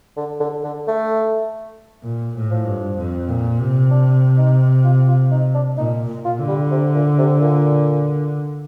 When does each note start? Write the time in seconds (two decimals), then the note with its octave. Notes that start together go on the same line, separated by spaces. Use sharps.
0.17 D3
0.40 D3
0.64 D3
0.87 A3
2.03 A#2
2.35 A2
2.50 F3
2.66 G2
2.97 F2
3.28 A#2
3.59 C3
3.91 D4
4.38 D#4
4.84 F4
5.08 F4
5.31 D#4
5.54 D4
5.77 A#2 D#4
6.08 A#2
6.25 F4
6.40 D3
6.48 G3
6.71 C3
6.95 A#2
7.18 C3
7.41 A#2